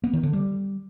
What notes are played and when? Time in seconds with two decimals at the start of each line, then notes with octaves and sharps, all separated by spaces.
0.04 B3
0.13 D#3
0.23 D3
0.33 G3